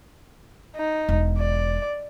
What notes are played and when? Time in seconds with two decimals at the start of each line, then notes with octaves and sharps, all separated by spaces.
0.76 D#4
1.08 E1
1.39 D5